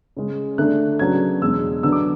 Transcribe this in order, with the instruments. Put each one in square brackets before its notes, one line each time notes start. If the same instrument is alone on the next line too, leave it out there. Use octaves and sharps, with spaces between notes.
[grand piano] C#3 G#3 C#4
D3 A3 D4 F#6
C#3 F#3 B3 D4 G#6
E2 B2 G#3 D4 E6
D3 F#3 B3 D4 E6
D6